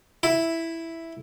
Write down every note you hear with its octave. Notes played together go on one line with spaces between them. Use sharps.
E4